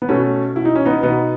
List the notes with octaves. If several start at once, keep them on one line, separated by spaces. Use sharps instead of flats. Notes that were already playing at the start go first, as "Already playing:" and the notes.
B3
B2 A3 C#4
B2 E4
D#4
C#4
B3 D#4
B2 B3 D#4